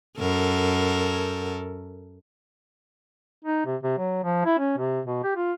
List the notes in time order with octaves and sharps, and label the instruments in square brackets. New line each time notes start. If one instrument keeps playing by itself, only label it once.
[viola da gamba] F#2 A4 A#4
[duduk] D#4
C3
C3
F#3
F3
E4
C#4
C3
B2
G4
F4